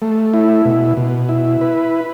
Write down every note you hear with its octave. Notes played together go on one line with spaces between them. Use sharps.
A3
E4
B2
B2
E4
B4